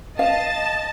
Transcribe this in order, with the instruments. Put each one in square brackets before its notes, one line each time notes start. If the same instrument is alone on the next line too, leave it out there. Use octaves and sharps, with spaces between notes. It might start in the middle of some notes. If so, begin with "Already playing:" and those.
[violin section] D#5 A5 A6 [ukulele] F5